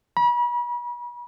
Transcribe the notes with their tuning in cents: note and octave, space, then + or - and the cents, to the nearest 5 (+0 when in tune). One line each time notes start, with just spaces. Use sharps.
B5 -40